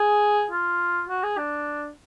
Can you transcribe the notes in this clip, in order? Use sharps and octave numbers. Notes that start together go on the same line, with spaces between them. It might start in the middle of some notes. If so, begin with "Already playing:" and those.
Already playing: G#4
F4
F#4
G#4
D4